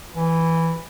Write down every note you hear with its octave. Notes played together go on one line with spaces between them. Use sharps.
E3